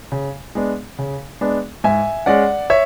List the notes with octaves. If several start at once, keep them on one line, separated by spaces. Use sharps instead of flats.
C#3
G#3 B3 D4
C#3
G#3 B3 D4
G#2 E5 G#5
G#3 C#4 D5 F#5
C#5 E5